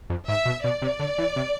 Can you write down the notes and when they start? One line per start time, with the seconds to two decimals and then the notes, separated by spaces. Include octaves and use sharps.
0.10 F2
0.28 G#2 E5
0.45 B2
0.64 B2 D5
0.82 C3
0.99 D3
1.18 E3
1.36 C3